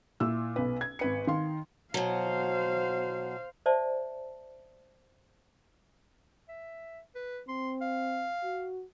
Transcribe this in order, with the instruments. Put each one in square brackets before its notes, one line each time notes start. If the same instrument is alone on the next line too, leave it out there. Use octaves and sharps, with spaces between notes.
[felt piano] A#2 E4 E6
B1 B4
G#6
G#1 B4 C#7
D#3 F5 C6
[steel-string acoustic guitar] B2 F#3 [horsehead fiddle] C5 F5
[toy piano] C5 D5 E5 A5
[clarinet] E5
B4
[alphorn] C4 [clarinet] C6
[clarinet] F5
[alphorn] F#4